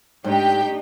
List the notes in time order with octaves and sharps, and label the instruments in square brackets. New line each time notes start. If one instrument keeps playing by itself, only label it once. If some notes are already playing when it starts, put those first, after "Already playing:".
[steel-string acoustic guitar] G#2 [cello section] A3 D4 D#4 [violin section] G4 G5